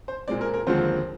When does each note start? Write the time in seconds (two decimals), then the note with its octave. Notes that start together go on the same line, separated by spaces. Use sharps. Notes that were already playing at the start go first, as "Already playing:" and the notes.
0.08 C5
0.28 A#2 G#3 C4 D5
0.41 A#4
0.54 A#4
0.67 D#2 D3 F3 G#3 C4 C5